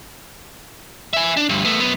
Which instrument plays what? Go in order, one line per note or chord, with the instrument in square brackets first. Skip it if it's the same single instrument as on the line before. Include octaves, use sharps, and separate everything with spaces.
[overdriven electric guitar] E5 G#5
D4
D2 G2
A3 B3
F#2 B3